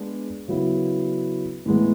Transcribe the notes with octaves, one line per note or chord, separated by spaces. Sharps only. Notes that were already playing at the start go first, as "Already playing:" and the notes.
Already playing: G#3 B3 D4
C#3 F#3 B3 E4
A2 E3 G#3 B3